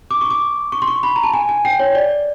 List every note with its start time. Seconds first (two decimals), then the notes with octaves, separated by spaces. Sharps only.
0.11 D6
0.21 C#6
0.30 D6
0.72 C#6
0.82 C6
0.88 C#6
1.03 B5
1.16 A#5
1.23 A5
1.34 G#5
1.49 G#5
1.65 G5
1.80 C#5
1.95 D5